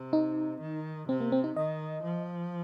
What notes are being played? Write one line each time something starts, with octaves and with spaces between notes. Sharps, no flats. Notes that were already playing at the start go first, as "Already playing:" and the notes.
Already playing: C3
D#4
D#3
C3 C4
A#3
C4
D#4
D#3 D#5
F3